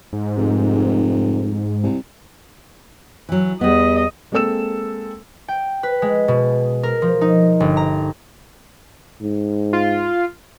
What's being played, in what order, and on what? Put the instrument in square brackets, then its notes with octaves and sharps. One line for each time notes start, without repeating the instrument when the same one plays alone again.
[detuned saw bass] G#2
[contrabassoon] F1
C2
[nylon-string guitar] E3 F#3
[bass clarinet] E2 [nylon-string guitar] G3 B3 [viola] D#5
[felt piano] G#3 A#3 C4 A4 E6 E7
[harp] G5
B4
G#3
B2
A#4
F3
D#4
G1
A#5
[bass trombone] G#2
[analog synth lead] F4